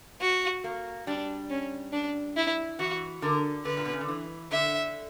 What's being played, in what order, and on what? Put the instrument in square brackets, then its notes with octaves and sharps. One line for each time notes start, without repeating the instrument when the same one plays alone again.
[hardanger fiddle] F#4
[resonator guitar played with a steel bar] A#3
[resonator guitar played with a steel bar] G3 [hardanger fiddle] D4
[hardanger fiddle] C#4
D4
E4
[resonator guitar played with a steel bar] E3 [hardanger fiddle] F#4
[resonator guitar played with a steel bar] D3 [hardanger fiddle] A#4
[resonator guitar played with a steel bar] D3 [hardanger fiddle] B4
[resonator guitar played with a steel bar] A#2
B2
C#3
D3
E3
[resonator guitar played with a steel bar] D3 [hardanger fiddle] E5